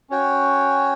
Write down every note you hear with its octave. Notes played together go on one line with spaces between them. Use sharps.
C#4 F#4 C#5 G5